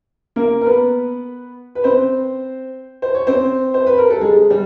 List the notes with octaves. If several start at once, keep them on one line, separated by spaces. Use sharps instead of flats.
A#3 A#4
A#4
B3 B4
B4
C4 C5
C5
C#5
C4 C5
C5
B4
A#4
A4
G#3 G#4
G3